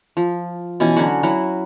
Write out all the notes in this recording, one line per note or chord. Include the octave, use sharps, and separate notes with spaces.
F3
B2 E3 C#4 G#5
D3 F#3 C#4 F#4
F#3 E4 F#4